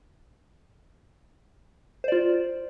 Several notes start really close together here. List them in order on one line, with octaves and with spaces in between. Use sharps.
C5 D5 F4